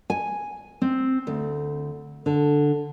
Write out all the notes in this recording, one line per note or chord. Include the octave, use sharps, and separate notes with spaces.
G#5
C4
D2
D3